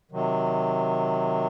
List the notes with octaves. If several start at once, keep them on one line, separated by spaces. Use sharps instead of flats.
C3 D#3 F#3